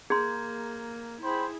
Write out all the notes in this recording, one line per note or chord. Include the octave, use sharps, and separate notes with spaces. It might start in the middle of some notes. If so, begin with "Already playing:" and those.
A#3 G#4 A#5 C6 G6 G#6
C4 E4 G#4 C5 B5